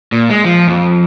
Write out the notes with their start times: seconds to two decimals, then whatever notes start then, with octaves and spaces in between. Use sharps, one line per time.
0.12 A#2
0.30 G#3
0.44 F3
0.68 F2